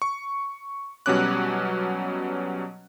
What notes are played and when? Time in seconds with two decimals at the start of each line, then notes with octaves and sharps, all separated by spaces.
0.02 C#6
1.06 B2 F#3 G3 C#4 D6 F#6